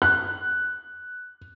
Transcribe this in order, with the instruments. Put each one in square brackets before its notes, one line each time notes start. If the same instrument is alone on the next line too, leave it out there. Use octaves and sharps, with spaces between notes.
[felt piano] F#6